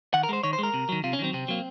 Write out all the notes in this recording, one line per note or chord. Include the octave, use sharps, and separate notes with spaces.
D#3 F#5
A#4
G#3 C5
D#3 C#5
C5
G#3 A#4
C3
D#3 F#3
C3 F4
C#4
D#3 F#3 C4
C3 C4
F#3 A#3